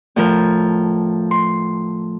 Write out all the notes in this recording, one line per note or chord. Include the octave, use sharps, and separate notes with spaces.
A2 F3 A#4
C6